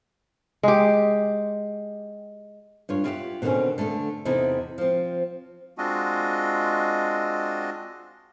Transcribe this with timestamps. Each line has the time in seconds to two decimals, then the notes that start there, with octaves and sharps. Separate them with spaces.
0.63 G#3 G4
2.89 G2 F4 C#5
3.04 E4 F4 G4 D5 E5 F#5
3.42 B2 D3 D#3 G3 C4 C#4
3.78 D3 A3 B3 A4
4.25 E2 C3 D#4 E4 G#4 A4
4.78 F3 C4
5.78 G#3 C4 D4 F4 F#4 D#5